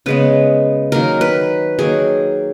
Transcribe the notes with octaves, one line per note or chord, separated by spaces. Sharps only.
C#3 G#3 B3 B4
D#3 F#3 A#3 A#4
B4
D#3 F#3 A#3 G#4